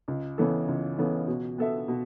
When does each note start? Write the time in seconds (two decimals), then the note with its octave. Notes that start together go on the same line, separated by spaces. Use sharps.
0.08 C#2
0.38 C#3 E3 B3 A4
0.68 C#2
0.98 C#3 E3 B3 A4
1.28 B2
1.58 B3 A4 E5
1.88 B2